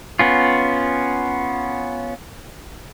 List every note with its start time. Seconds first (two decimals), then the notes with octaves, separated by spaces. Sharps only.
0.19 B3 C#4 F4